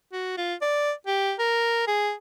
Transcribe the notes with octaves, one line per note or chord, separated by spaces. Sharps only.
F#4
F4
D5
G4
A#4
G#4